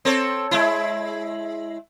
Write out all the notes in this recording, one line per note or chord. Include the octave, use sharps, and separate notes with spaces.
C4 A4 C#5
G#3 E4